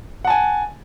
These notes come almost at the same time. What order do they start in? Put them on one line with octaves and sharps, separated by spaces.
F#5 A5 G#5